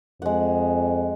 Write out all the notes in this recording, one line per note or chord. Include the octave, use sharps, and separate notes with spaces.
F2 G#3 F#5